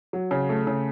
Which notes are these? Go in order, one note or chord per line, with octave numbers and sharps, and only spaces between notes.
F#3
C#3
A3
C#3